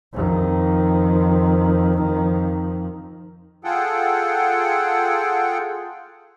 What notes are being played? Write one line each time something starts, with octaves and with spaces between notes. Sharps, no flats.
F2 D#3
F4 G#4 A4 F#5 G5